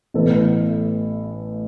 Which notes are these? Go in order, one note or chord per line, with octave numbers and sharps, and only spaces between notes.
A1 A2 E3 B3 A4